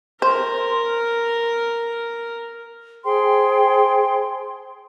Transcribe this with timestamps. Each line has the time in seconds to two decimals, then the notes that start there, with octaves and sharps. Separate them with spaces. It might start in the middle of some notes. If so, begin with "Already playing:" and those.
0.22 A#4 C5
3.04 G#4 C5 G5 C6